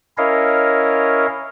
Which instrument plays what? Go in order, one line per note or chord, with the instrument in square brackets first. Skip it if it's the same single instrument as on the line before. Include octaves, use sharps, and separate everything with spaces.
[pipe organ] C#4 E4 A#4 C#5 D#5 F5